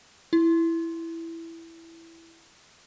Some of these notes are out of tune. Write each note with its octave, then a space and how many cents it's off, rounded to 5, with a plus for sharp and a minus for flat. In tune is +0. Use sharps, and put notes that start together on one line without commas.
E4 +5